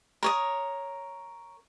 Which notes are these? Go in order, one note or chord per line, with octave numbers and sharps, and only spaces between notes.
A#4 C#5 D#6